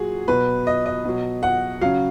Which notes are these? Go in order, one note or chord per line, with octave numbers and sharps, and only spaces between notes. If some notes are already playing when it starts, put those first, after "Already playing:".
Already playing: A#2 F#3 F#4 G#4
B2 F#3 B4
D#5
D#5
B2 F#3
F#5
C#3 F#3 F5